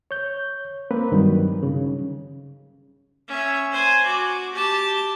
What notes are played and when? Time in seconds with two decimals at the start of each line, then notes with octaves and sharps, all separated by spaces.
0.11 C#5 G6
0.91 A#3 C4 B4
1.12 G2 D#3 F#3 G3
1.63 C#3
3.28 C#4 E5
3.72 C5 G#5
4.06 F#4 D6
4.52 G4 A5